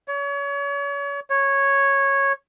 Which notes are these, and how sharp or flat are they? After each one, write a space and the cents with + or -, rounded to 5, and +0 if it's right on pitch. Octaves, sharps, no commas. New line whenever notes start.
C#5 +35
C#5 -10